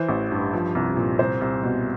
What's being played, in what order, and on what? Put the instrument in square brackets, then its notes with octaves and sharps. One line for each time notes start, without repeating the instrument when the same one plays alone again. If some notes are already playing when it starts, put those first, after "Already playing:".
Already playing: [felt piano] E3 C5
A1
G2
F3
C2
A#2
C2 C5
C2
B2